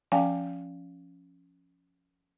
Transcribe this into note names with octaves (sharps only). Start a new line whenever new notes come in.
F3 C#4 F5 G5 G#5